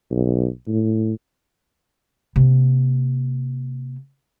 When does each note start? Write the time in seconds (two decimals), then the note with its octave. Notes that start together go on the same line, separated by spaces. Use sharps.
0.11 B1
0.68 A2
2.36 C3 A#3